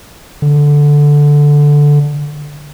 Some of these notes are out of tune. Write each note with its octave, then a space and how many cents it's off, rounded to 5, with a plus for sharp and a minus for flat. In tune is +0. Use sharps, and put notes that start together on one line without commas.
D3 -5